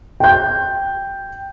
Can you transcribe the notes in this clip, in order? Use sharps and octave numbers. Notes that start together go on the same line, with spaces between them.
G5 G6